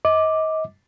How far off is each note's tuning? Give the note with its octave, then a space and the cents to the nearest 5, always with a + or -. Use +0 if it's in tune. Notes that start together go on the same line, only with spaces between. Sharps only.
D#5 +30 D6 +0